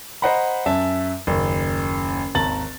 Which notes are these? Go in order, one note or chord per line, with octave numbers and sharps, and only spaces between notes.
C5 D#5 F#5 A#5 B5
F#2 E5 A5
F#1 D#2
G#1 D#2 A5 A#5 A6 F#7